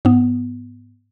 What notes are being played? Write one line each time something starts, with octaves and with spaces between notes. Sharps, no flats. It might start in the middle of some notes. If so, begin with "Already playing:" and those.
G#2 B3